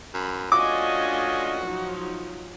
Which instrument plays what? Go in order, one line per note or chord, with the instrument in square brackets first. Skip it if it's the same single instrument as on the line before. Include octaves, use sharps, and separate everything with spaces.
[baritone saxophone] F#2 [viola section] B5
[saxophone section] A3 C#4 F4 [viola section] D4 D#5 G#5 [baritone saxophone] F#4 [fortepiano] D6
[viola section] F3 F#3 D#4